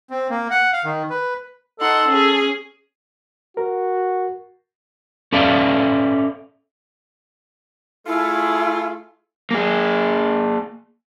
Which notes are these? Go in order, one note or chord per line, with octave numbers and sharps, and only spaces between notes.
C4
A#3
F#5
F5
D#3
B4
D#4 A4 F#5 C6
C#4 G#4
F#4 A#4
C#4 A4 D5 E5 F5
A3 E4 F4 G#4
A#3 G#4